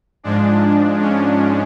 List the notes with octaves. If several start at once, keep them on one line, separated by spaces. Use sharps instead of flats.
G#2 F3 G#3 D4
C#4